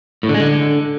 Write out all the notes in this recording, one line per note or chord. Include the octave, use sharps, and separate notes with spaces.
A2
D3
G#3
D3